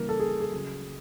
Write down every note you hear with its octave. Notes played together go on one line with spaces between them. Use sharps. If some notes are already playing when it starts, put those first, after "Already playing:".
Already playing: C#3 E3 G3 A#3 A#4
A4
G#4
G#4
C#3 F#3